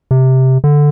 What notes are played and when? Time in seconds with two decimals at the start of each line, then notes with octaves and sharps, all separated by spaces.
0.11 C3
0.64 D3